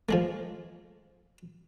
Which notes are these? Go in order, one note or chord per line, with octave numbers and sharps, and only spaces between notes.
F3 G#3 A3